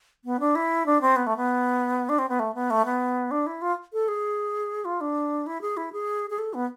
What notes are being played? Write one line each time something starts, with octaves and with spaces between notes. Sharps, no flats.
B3
D4
E4
D4
C4
B3
A3
B3
D4
C4
B3
A3
B3
A3
B3
D4
E4
F4
A4
G#4
F4
D4
E4
G#4
E4
G#4
G#4
A4
B3